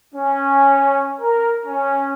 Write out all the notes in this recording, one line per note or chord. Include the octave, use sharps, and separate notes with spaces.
C#4
A#4
C#4